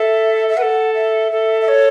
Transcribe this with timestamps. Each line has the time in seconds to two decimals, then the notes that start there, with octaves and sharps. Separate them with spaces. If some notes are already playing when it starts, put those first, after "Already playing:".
Already playing: A4 E5
0.49 E5
0.57 B4 F#5
0.62 A4
0.94 E5
1.32 A4
1.61 E5
1.68 C#5